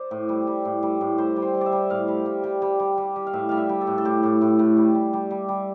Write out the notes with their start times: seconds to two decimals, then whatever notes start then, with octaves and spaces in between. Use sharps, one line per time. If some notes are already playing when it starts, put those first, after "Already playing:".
Already playing: C5 D5
0.11 A2
0.29 G3
0.47 G3
0.65 A2
0.83 G3
1.01 A2
1.18 G3 C5
1.36 G3
1.42 C5
1.54 G3
1.61 D5 E5
1.72 G3
1.90 A2 F5
2.08 G3
2.26 G3
2.44 G3
2.62 G3
2.80 G3
2.98 G3
3.16 G3
3.27 F5
3.33 A2 E5
3.49 G3 F5
3.57 E5
3.69 G3
3.81 A4
3.87 A2
3.98 A4
4.05 A2 G4
4.23 A2
4.41 A2
4.59 A2
4.77 G3
4.95 G3
5.13 G3
5.31 G3
5.48 G3